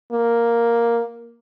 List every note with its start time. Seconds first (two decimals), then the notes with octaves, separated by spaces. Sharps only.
0.12 A#3